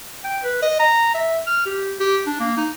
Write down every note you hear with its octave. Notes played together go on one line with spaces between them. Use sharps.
G5
B4
D#5
A#5
E5
F6
G4
G4
D4
A#3
D#4